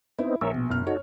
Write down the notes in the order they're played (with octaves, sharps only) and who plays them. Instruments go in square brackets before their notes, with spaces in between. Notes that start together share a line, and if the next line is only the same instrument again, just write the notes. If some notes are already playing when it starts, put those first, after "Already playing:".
[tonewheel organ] B3 C4 D#4 [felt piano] E4
[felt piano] A#1 [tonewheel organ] A#4 C#5 E5
[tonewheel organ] B2
[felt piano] F#1 F6
[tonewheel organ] D#4 F#4 A4 [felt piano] C#5